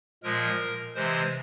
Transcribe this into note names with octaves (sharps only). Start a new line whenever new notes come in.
A#2 F3 G#3 A#4
C3 E3 G#3 C5